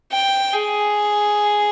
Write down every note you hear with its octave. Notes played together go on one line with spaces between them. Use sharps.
G5
G#4